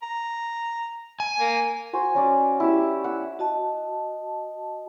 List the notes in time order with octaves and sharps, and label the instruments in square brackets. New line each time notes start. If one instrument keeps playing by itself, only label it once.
[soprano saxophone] A#5
[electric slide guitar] G#5
[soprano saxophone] A#3
[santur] F#4 C5 G#5
F#3 C#4 D5
E4 G4 E6
F#5 E6
[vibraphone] F#4 D#5 A5